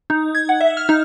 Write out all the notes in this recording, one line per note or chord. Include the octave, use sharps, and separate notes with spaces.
D#4
G#6
F#5
E5
F6
D#4